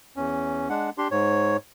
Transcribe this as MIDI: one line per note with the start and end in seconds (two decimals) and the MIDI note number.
0.16 0.69 40
0.16 0.69 61
0.69 0.90 56
0.69 0.90 62
0.69 0.90 78
0.98 1.08 62
0.98 1.08 67
0.98 1.08 84
1.11 1.57 44
1.11 1.57 73